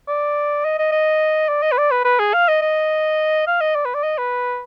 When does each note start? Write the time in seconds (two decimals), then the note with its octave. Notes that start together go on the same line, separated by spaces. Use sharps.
0.08 D5
0.65 D#5
0.79 D#5
0.92 D#5
1.48 D5
1.62 D#5
1.72 B4
1.78 D5
1.91 B4
2.05 B4
2.19 G#4
2.34 F5
2.48 D#5
2.62 D#5
3.47 F5
3.61 D#5
3.75 D5
3.85 B4
3.94 D5
4.03 D#5
4.18 B4